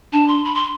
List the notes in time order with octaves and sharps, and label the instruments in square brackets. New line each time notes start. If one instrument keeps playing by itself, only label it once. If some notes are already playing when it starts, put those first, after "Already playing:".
[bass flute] D4 [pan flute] A5
[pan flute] C6
B5
C6